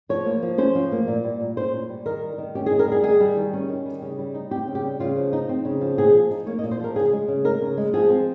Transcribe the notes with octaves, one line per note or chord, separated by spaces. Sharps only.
F3 C#5
A#3
F3
C#4 C5
F3
A#3
A#2
G3
A#2
C#4 C5
A#2
G3
D#3 A#4
G3
D#3
C#4 G4
G#4
D#3
A#4
G3 G#4
D#3 G#4
G3
D#3
C#4
D#3
G3
C#3
G3
D#4
C4 G4
C#3
G4
G3
C#3 F4
F3
D#4
C4
C#3
F3
A#2 G#4
F3
D#4
A#3 C#5
D#5
A#2
C5
F3 A#4
C#3 G#4
G#3
C#3
D#4 A#4
C#3
G#3
F3 G#4
C4